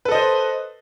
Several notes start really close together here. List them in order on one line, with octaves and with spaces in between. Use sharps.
B4 A4 D#5 C5